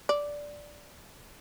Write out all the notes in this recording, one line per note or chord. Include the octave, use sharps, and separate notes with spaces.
D5